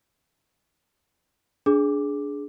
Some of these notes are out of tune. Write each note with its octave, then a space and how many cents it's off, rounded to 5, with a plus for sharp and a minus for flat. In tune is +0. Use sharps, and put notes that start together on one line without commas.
D4 -15 G#4 +15 D6 +0